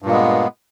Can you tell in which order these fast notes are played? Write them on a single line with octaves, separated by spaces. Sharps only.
G2 A#2 A#3 G#3 B3